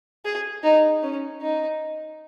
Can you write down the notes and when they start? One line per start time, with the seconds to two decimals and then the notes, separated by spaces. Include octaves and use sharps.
0.25 G#4
0.63 D#4
1.02 C#4
1.41 D#4